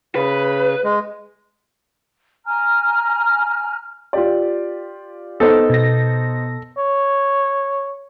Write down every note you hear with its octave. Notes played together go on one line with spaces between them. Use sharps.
C#3 B4
G#3
G#5 A#5 F6
F4 G4 D5
B3 D#4 A4 C5
B2 A#6
C#5